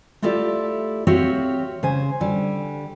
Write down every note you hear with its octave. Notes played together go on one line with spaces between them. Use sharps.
A3 E4 F4 G4 A4 D5
C4 F#4 G4 C#5 E5 F5
C#3 C5 G#5
D3 G3